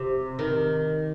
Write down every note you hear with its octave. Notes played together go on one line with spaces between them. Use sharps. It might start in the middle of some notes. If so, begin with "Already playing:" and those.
Already playing: C3
D#3